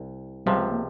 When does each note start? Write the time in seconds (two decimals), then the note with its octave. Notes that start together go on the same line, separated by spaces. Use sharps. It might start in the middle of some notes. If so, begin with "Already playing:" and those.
Already playing: C2
0.46 C#2 C3 F3 G3
0.59 G#3
0.72 A#3